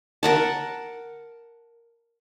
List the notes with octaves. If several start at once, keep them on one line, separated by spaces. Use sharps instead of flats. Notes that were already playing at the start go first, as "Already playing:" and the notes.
A#4 F#5 A5